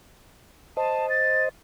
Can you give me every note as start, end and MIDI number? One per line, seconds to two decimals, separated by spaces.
0.77 1.49 72
0.77 1.49 75
0.77 1.09 81
1.10 1.44 93